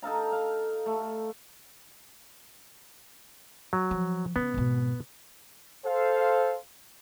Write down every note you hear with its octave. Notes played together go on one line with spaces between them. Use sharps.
D#4 A4 F5 A#5
F5
A3
F#3
F3
C#3 B3
G#1 B2
A4 C5 F5